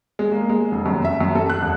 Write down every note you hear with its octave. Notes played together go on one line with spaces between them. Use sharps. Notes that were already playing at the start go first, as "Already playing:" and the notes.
G#3
A#3
G#3
F1
F#2
E5
F#2
A4
F#6
E1